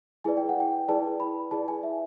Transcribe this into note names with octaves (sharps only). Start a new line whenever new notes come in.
E4 G#4 B4 D5 G#5
G5
F#5
G5
E4 G#4 B4 D5 A5
B5
E4 G#4 B4 D5 A5
G#5
E5